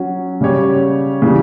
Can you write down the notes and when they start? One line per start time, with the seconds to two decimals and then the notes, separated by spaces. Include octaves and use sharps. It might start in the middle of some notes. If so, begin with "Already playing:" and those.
Already playing: F#3 C#4 F#4
0.41 C#3 G3 C#4 G4 C#5
1.22 C#3 E3 G3